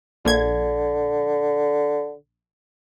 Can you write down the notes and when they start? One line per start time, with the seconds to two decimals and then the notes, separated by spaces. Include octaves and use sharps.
0.25 A#1 D3 G#6